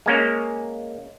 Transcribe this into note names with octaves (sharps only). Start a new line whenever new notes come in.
G#3 A#3 C#4